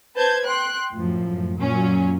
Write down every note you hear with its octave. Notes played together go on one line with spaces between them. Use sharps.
B4 C5 A5 G6 G#6
G5 C6 F#6
F#2 A2 F3
F#2 A#2 F#3 C#4